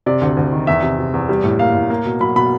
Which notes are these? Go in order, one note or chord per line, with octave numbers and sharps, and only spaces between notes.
C3 D5
D2
D2
D#3
E2 E5
C3
C3
E2
G3
A2
A#3 F5
A2
A#3
B2
F#3 B5
B2 B5